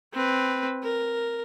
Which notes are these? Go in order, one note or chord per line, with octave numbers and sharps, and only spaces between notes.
C4 B4
A#4